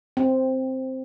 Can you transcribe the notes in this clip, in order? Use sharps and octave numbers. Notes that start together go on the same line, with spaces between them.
C4